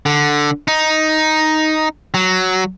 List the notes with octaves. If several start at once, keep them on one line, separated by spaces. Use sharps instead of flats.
D3
D#4
F#3